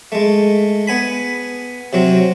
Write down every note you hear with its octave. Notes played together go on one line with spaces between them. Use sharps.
G#3 A3
B3 G#5 B5
C3 F#3 C4